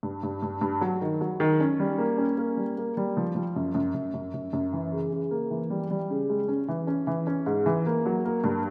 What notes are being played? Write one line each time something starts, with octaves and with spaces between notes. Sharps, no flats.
G2
G2
G2
G2
F#3
D#3
F#3
D#3
C#4
G3
A#3
C#4
A#3
G3
A#3
G3
F3
F3
F#2
F#2
F#2
F#2
F#2
F#2
E3
C#3
C#3
A#3
E3
G3
G3
C#3
G#3
C#4
E3
C#4
E3
C#4
G#2
E3
A#3
F#3
A#3
G2